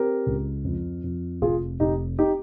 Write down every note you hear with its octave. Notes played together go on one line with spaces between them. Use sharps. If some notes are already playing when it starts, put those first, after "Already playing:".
Already playing: C4 G4 A#4
C#2
F2
F2
F1 F4 G#4
F1 D#4 G4
D#4 G4